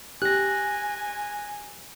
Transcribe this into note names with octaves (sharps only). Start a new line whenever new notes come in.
G4 G#5 F#6 A#6